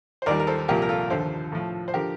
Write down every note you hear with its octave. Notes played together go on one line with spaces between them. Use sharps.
C5
D#2 D#3 G3 A#4 D5
A#4
A4 C5
C2 A#2 F3 G4 A#4
A#4
F4 A4
D#2 D3 F3 A4 C5
A2 F3
C5
D3 F3 G4 A#4